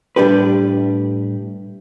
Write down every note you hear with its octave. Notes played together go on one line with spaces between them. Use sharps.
A2 G3 D4 G4 B4